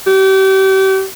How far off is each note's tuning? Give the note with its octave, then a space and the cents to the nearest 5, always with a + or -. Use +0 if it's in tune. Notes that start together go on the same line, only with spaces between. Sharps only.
G4 -35